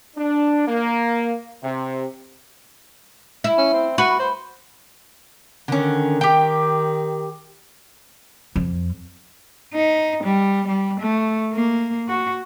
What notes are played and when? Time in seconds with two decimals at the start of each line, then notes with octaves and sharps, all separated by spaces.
0.17 D4
0.68 A#3
1.63 C3
3.44 E4
3.58 C#4
3.73 C4
3.98 F#4 B4
4.19 C5
5.68 D3 D#3 C#4
6.21 G4 G5
8.56 F2
9.74 D#4
10.24 G3
10.68 G3
11.00 A3
11.53 A#3
12.09 F#4